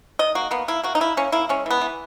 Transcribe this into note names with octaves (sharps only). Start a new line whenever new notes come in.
D#3 D#5
A#3 F#4
A#3 B3
A#3 E4
A#3 F#4
D#4
A#3 E4
A#3 C#4
A#3 E4
G#3 C#4
E3 B3
E3